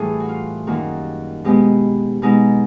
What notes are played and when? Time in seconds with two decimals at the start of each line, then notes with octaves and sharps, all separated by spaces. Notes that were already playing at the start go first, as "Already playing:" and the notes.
Already playing: A2 E3 G3 G#4
0.20 F#4
0.29 F4
0.67 F#2 D#3 G3 A#3 F#4
1.44 B2 G#3 B3 G4
2.22 B2 G#3 B3 D#4